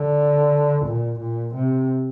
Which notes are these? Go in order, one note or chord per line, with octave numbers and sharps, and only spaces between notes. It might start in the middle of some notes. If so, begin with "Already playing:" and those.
Already playing: D3
A#2
A#2
C3